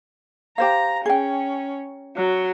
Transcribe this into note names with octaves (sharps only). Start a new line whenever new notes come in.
G4 C5 F5 A#5
C#4 G#4 G5
F#3